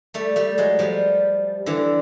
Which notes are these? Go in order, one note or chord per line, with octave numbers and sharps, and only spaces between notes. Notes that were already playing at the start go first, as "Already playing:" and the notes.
G3 A3
G3 A3
F#3 G#3
F3 G3
D3 E3